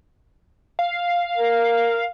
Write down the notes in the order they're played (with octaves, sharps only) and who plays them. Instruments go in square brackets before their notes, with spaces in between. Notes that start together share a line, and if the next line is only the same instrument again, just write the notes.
[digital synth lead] F5
[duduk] A#4